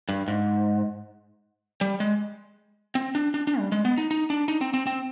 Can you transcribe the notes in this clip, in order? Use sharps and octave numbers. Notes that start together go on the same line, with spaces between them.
G2
G#2
G3
G#3
C4
D4
D4
D4
G3
G#3
B3
D#4
D#4
D4
D#4
C4
C4
C4